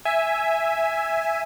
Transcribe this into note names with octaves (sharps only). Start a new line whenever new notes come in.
E5 G#5